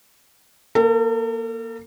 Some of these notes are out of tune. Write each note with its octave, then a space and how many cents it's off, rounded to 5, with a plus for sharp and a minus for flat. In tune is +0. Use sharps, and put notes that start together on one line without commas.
A#3 +15 A4 +45